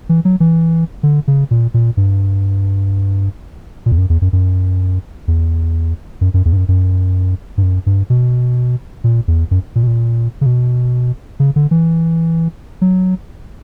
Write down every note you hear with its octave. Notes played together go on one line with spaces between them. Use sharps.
E3
F#3
E3
D3
C#3
A#2
A#2
G2
A#2
E2
F#2
E2
F#2
F#2
E2
F#2
F#2
E2
G2
F#2
F#2
G2
F#2
G2
B2
A#2
E2
F#2
A#2
B2
A#2
C#3
B2
C#3
D3
E3
F#3